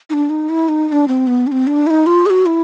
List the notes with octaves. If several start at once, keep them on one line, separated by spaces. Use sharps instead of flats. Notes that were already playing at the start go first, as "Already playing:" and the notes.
D#4
D4
D#4
E4
D#4
D#4
D4
C4
B3
D4
C4
D4
E4
D#4
F4
G#4
F#4
E4